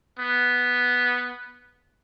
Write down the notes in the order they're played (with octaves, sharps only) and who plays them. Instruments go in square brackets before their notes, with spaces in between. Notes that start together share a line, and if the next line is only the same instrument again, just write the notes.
[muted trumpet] B3